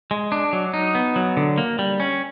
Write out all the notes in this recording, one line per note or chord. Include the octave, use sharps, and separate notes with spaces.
G#3
D4
F#3
D#4
B3
F#3
D3
A#3
G3
C#4